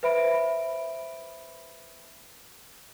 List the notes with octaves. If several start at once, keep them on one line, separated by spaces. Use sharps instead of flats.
B4 C5 E5 B5 D7